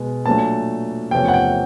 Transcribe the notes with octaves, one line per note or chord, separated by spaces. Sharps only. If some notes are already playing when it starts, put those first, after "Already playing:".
Already playing: B2 G#3
A#2 F#3 A3 D4 A5
E2 C3 F3 A3 C#4 G5
F#5
G5